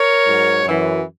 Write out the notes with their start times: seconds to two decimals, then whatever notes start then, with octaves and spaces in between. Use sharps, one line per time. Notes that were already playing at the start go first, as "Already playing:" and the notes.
Already playing: A#4 C#5
0.25 G#2 F#3
0.63 F#2 E3